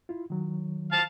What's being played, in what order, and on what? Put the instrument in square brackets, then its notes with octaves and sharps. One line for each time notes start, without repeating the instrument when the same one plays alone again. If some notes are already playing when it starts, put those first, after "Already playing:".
[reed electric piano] E4 F4
D#3 F#3
[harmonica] F5 A5